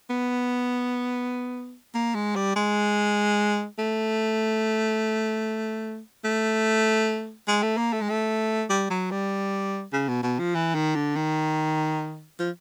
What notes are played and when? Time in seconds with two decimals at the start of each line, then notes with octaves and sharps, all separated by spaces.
0.10 B3
1.95 A#3
2.15 G#3
2.36 G3
2.56 G#3
3.79 A3
6.24 A3
7.48 G#3
7.63 A3
7.77 A#3
7.93 A3
8.01 G#3
8.10 A3
8.70 G3
8.90 F#3
9.11 G3
9.93 C#3
10.08 B2
10.23 B2
10.39 F3
10.55 E3
10.75 D#3
10.95 D3
11.16 D#3
12.39 F3